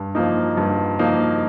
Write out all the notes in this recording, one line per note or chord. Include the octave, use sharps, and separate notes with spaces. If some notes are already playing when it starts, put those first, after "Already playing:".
Already playing: G2
F3 A#3 D#4
G2
F3 A#3 D#4